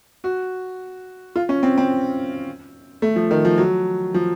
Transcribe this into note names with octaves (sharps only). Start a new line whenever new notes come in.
F#4
F4
C#4
C4
C4
A3
F3
D#3
F3
F#3
F3